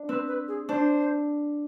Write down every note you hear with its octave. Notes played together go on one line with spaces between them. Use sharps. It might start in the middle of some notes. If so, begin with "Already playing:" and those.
Already playing: D4
C4 B4
B4
G#4
D4 C5